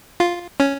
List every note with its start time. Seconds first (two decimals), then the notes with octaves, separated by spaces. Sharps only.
0.20 F4
0.60 C#4